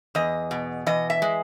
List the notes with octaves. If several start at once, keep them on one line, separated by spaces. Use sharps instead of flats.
E2 D#5
B2
E3 D#5
E5
G#3